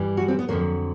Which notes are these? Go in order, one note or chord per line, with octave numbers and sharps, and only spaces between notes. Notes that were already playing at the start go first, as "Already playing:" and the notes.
Already playing: G2 E3 G3
F#4
C4
B3
F2 D3 F#3 A#3